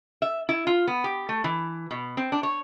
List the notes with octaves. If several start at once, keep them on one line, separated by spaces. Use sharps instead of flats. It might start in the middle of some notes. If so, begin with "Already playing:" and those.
E5
E4
F4
B3
G4
A3
E3
B2
C4
D4
C#5